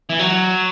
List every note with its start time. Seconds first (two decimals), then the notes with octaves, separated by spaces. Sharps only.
0.10 E3
0.19 F#3